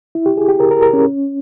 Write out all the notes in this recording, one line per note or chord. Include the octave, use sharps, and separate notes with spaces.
E4
G4
G#4
G4
A#4
A#4
A#4
C#4